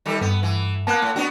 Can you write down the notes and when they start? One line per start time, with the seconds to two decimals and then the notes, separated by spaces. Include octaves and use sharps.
0.06 D#3 G3 A4
0.21 G2 B3
0.43 E3
0.87 A#3 B3 A5 F#6
1.02 A2
1.16 B3 D4 F#4